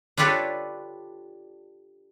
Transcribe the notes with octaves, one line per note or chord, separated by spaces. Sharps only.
D4 F4 G4 A4 B4 C#5